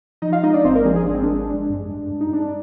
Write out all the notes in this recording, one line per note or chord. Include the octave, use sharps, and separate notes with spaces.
F3 D#4 D#5
F4 F5
G#3 D#4 D#5
D4 D5
G#1 C4 C5
A#3 A#4
F3 G#3 G#4
G#3 G#4
G#1 D4
C4
G#3 D4
G#3
G2
G2
G2
D#4
G#3 D4